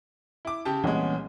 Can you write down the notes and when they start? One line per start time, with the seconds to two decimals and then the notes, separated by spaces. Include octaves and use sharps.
0.45 E4 D6
0.65 C#3 G4 A5
0.84 C2 A#2 E3 G#3 B3 C#4